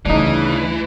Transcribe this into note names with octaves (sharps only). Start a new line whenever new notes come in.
D2 C#3 E3 G3 D4 D#4